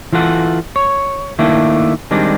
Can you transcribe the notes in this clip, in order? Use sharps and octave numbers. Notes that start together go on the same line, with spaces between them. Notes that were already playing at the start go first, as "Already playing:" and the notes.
E3 F4 A4 F#5
C#5
D#3 A3 A#3 D4 E4
D#3 G3 G#3 C4 D4